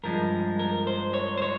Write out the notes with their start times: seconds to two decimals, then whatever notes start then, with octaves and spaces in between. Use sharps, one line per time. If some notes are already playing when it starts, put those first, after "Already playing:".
0.04 G2 F3 G#3 A#4
0.59 A#4
0.87 C5
1.14 C#5
1.38 C5
1.42 C#5